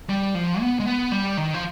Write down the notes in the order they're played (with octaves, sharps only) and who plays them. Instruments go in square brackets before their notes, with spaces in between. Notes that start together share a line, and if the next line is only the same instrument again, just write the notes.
[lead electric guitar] G3
F3
B3
G#3
B3
G3
D#3
F3